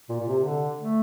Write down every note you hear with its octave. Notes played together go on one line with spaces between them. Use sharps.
A#2
A#2
C3
D3
A3